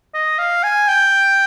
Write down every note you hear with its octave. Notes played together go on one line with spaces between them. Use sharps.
D#5
F5
G#5
G5